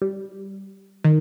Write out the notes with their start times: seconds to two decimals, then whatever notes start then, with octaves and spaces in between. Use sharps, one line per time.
0.02 G3
1.04 D#3